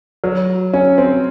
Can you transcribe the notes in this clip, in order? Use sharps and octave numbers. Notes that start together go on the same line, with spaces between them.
F#3
C#4
C4